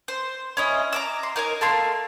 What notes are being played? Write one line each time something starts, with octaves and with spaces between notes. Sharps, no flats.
C5
C#4 E4 D#5
A#5 D6 E6
C6
D#4 A#4 C#5 G#5
A3 A#3 C6